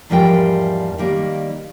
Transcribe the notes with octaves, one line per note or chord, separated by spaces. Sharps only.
E2 G#2 F3 G3 A#4 G5
D#3 G3 A#3